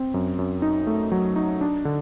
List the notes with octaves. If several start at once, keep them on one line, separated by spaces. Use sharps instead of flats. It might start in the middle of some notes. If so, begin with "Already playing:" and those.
Already playing: C4
F#2
F#2
D#4
A3
F#3
D#4
D4
D3